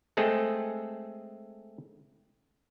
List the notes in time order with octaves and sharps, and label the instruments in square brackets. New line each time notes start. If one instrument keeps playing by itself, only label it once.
[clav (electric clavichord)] G#3 A3 C4 G#4 A4